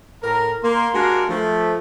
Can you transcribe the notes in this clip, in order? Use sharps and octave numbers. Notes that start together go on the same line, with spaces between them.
A2 A#4 A#5
A#3 C6
G#3 D4 F#4 G4 A#4 F5
F3 A3